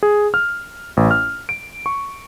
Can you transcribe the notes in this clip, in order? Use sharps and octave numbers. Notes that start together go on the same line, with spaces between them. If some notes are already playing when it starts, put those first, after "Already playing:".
G#4
F6
A1
F6
D7
C#6